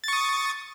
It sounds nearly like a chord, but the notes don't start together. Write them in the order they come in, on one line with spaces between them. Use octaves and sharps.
A6 C#6 D#6